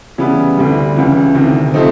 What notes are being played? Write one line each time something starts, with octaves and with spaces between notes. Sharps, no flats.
C#3 E3 G3 B3
D2 D3 G3
C#2 C#3 E3
D2 C3 D#3
C3 F3 A3 C4 D#4